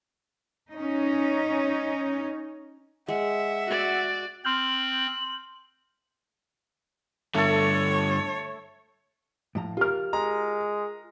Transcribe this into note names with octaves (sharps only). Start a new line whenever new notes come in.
C#4 D#4
G#3 E5 F#5
F#4 D5
C4 C6 F6 G6 F#7
G2 D3 A3 A4 C#5
A2 F3 A#5
F4 G4 A#4 F6
G#3 A#5